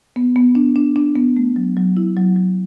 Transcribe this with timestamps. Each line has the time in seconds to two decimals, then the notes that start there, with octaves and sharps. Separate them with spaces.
0.16 B3
0.36 B3
0.55 D4
0.76 D4
0.96 D4
1.16 B3
1.37 A3
1.56 F#3
1.77 F#3
1.97 E4
2.17 F#3
2.36 F#3